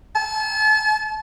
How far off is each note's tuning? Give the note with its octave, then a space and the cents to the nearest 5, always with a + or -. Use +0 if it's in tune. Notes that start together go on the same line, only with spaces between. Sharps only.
A5 -35